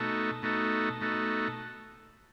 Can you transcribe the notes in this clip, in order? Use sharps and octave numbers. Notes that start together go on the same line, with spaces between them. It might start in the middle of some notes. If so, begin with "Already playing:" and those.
Already playing: B2 A3 D#4 F#4 A4
B2 A3 D#4 F#4 A4
B2 A3 D#4 F#4 A4